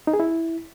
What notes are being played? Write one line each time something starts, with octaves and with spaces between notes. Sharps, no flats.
D#4
G#4
E4